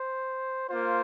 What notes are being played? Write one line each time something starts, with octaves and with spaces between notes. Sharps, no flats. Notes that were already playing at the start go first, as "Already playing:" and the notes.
Already playing: C5
A#3 F4 C5